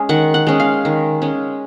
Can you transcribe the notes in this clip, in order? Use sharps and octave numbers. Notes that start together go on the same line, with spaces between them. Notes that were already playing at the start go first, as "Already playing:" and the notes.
Already playing: G#3 C#4
D#3 F#5
F#5
G#3 C#4
F5
D#3
G#3 C#4